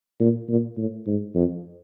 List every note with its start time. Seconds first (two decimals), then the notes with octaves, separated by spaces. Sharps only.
0.20 A#2
0.48 A#2
0.77 A2
1.06 G#2
1.35 F2